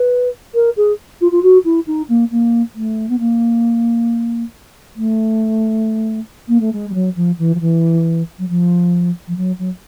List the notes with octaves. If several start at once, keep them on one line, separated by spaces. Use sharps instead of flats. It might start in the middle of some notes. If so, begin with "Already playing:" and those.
Already playing: B4
A#4
G#4
F4
F4
F#4
E4
D#4
A#3
A#3
A3
B3
A#3
A3
A#3
A3
G#3
G3
F#3
F3
E3
F3
E3
F#3
F3
F3
F#3
F#3